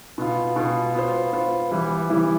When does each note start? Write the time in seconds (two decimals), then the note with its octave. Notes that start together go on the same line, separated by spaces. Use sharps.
0.18 B2 B3 F4
0.56 B2 B3 F4
0.95 B3 F4 C5
1.33 B3 F4 C5
1.71 E3 G3 B3 E4 B4
2.09 E3 G3 B3 E4 B4